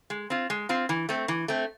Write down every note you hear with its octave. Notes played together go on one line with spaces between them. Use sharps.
G#3
C4 F4
G#3
C4 F4
E3
A3 C4
E3
A3 C4